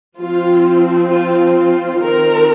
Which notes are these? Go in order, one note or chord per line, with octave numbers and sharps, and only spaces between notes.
F3 C4 F4
F4
F4
D#3 C4 A#4